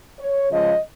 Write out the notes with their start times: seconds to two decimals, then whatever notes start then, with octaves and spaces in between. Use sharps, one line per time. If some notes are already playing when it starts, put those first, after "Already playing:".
0.20 C#5
0.51 C#3 F3 G#3 D#5